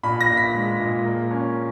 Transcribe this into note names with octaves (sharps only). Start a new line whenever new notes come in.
A#2 B5
A#6
A#2
B6
G#3
A#2
A#3
C#4